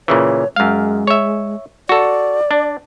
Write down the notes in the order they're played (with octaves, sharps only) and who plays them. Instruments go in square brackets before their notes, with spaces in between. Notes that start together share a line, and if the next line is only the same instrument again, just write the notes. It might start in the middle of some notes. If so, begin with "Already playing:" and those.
[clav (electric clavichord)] A#2 C#3 E3 [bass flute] C#5
[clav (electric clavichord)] F#2 F5 [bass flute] G#3
[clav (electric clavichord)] C#5 E5
[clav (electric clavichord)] F#4 A4 [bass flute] D5
[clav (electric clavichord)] D4